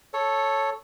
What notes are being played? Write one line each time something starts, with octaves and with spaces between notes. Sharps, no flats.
A4 C#5